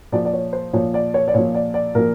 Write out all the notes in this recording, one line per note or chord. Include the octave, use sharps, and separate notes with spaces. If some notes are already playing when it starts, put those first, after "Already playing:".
A#2 F3 D5
D5
C#5
C5
A#2 F3 C#5
D5
C#5
D5
A#2 F3 C#5
D5
D5
A#2 F3 A#4